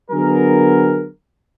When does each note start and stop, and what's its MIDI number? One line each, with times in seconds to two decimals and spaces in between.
0.11 1.06 50
0.11 1.06 54
0.11 1.06 59
0.11 1.06 68
0.11 1.06 70